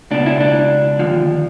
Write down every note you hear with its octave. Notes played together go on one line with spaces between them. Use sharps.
C#2 B2 D4
E4
D4
D#2 D3 F3